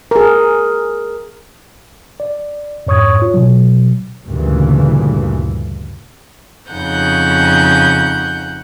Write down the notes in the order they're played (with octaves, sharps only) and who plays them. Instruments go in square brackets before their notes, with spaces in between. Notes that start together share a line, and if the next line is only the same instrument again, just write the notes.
[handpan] G#4 A#4
[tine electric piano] D5
F2 G#2 C#5 C#6 D#6 G#6
F4 C#5
B2 F#3
[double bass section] D2 G2 A#2 C#3 E3
[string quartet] F2 C#3 D#4 F#5 G6